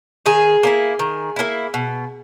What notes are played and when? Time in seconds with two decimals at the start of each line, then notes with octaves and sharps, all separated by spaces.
0.26 D#3 G#4
0.63 A#3 C#4 E4
0.99 D#3
1.36 A#3 C#4 E4
1.74 B2